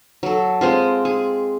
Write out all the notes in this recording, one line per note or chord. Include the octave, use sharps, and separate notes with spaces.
F#3 A4
G#3 C4 F4
G#4